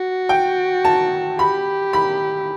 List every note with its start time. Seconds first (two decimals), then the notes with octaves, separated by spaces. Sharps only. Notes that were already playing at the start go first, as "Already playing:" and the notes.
Already playing: F#4
0.29 G5
0.85 A5
1.38 G4 B5
1.93 B5